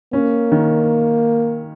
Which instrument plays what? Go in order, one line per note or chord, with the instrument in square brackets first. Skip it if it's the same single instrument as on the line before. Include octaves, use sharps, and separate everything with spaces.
[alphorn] A#3 [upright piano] C#4
[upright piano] D#3